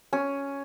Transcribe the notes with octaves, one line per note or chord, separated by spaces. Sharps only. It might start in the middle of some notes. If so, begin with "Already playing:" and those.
C#4